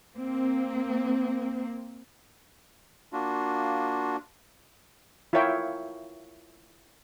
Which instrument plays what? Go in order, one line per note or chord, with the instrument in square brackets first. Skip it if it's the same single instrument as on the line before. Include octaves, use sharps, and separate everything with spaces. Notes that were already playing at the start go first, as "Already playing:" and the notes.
[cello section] A#3 C4
[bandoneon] A#3 D4 F4 F#4
[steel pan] E4 F4 A#4 C#5 E5 G5